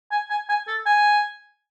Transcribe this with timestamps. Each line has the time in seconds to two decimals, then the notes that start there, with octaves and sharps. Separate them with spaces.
0.12 G#5
0.30 G#5
0.49 G#5
0.67 A4
0.86 G#5